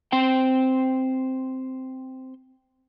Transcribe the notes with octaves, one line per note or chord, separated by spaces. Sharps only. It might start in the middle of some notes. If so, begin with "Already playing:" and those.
C4 C5 G5